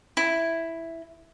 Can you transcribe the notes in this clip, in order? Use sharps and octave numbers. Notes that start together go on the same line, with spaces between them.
E4